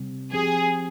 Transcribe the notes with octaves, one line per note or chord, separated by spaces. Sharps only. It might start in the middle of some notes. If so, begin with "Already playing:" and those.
Already playing: C3 G3 C4
F3 C4 G4 G#4